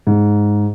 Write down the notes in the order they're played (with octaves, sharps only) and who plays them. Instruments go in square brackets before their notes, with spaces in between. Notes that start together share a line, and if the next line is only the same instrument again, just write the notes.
[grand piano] G#2